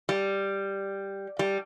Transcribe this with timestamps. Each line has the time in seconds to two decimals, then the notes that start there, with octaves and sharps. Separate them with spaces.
0.09 G3
1.39 G3